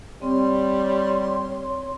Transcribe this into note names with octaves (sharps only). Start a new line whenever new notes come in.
G3 C4 C#5 C6